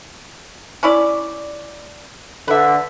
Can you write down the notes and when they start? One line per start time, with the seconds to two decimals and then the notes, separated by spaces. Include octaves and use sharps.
0.83 C#4 E4 D5
2.48 D3 B4 E5